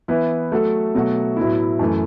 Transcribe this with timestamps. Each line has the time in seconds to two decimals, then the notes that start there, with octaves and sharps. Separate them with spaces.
0.08 E3 B3 E4 B4
0.52 F#3 A3 F#4 A4
0.95 B2 F#3 A3 F#4
1.36 A2 F#3 B3 E4
1.79 F#2 E3 A3